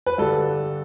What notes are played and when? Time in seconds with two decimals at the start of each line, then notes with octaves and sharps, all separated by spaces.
0.06 B4
0.18 G2 D3 G3 A4